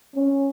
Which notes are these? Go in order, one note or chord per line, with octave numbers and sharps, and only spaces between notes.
C#4